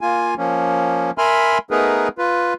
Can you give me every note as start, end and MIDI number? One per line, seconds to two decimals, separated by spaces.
0.01 0.34 58
0.01 0.34 65
0.01 0.34 80
0.38 1.11 53
0.38 1.11 58
0.38 1.11 61
1.18 1.58 70
1.18 1.58 76
1.18 1.58 80
1.18 1.58 83
1.18 1.58 84
1.18 1.58 89
1.71 2.08 57
1.71 2.08 59
1.71 2.08 63
1.71 2.08 68
1.71 2.08 70
1.71 2.08 71
2.18 2.54 65
2.18 2.54 71